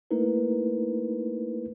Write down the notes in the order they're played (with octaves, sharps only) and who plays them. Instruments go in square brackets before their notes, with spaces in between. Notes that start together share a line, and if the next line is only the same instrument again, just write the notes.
[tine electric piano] A3 A#3 D#4 E4 A#4 B4